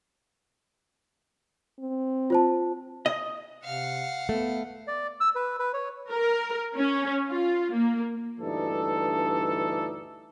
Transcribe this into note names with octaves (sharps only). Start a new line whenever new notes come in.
C4
F4 C5 A5
D#5
C3 F5 F#5
A3 B3
D5
E6
B4
B4
C#5
A#4
C#4
F4
A#3
D2 G2 E3 D4 D#4 A4